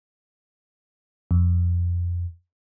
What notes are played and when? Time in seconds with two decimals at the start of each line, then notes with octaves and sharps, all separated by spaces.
1.31 F2